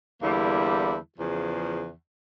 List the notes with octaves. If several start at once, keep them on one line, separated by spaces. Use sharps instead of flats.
E2 D3 G3 A#3 E4
E2 C#3 F3